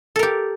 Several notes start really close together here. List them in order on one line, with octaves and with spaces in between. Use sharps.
A4 A#4 G4